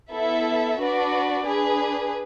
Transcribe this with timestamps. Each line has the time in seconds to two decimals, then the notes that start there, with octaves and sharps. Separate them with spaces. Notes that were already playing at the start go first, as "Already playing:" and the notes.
0.11 B3 E4 A4 E5
0.79 D4 F#4 B4 D5
1.46 D4 G#4 B4